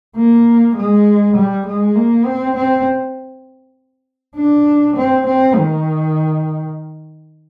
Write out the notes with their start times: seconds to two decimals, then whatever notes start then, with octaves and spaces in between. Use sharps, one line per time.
0.16 A#3
0.76 G#3
1.36 G3
1.66 G#3
1.95 A#3
2.25 C4
2.56 C4
4.36 D4
4.96 C4
5.26 C4
5.56 D#3